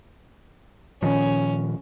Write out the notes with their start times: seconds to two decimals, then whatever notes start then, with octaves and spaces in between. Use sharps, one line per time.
1.03 A#2 D#3 F3 C#4